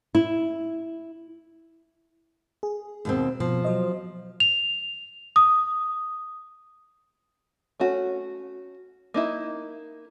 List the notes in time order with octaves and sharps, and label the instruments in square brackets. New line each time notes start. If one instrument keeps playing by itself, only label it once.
[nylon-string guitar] E4
[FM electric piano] G#4
[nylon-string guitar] D#2 B2 C4
[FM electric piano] B2 [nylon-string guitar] F3
[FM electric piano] F#3 C5 D#5
[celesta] F7
D#6
[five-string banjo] A3 C#4 F#4
A#3 D#4 E4